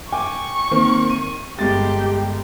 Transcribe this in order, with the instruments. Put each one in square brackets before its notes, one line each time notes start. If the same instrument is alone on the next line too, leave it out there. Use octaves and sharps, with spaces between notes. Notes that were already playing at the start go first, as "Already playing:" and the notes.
[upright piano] G5 G#5 D6 [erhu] C#6
[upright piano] D#3 A#3 C4
D#7
[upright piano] G1 G#3 A6 [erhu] G4